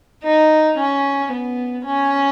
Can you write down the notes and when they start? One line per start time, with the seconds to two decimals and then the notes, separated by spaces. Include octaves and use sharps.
0.23 D#4
0.78 C#4
1.32 B3
1.86 C#4